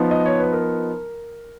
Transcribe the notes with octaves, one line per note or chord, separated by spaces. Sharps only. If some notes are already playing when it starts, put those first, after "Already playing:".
Already playing: F3 B3 D#4
D#5
C#5
B4
A#4